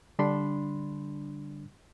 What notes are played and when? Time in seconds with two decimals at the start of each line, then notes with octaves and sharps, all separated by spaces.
0.19 D3 G3 D4 B5 C6